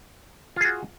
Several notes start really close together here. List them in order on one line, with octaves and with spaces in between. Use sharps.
F4 G#4 F#4